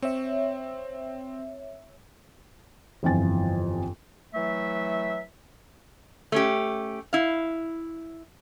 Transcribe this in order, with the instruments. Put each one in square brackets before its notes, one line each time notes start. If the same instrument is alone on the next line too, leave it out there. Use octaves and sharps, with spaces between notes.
[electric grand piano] C4 [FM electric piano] C#5 E5
[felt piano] G1 F2 E3 F4 G#5 A6
[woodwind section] E3 F#3 A3 E5
[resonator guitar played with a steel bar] A3 C#4 G4
E4 F5